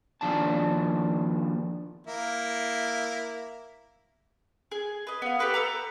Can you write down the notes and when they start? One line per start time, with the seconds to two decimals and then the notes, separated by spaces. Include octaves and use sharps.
0.21 D#2 E3 F3 D4 A5
2.07 A#3 E4
4.71 G#4
5.07 B4 D#5
5.22 B3 F5
5.39 G4 A4 B4 F#6
5.54 A4 B4 A#5